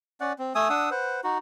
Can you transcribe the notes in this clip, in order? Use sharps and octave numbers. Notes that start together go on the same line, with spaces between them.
C#4 D5 F#5
C4
A3 G#5 D#6 E6
D4 F#5 D#6 E6
B4 C5 F#5
D#4 F#4